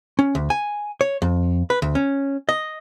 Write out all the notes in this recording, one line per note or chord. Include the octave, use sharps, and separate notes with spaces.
C#4
D2
G#5
C#5
F2
B4
D2
C#4
D#5